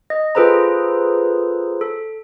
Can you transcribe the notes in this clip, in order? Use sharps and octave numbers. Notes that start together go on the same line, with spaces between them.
D#5
F4 G#4 A4 B4 C5 A#5
A4